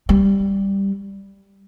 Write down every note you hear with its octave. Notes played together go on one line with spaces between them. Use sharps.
G3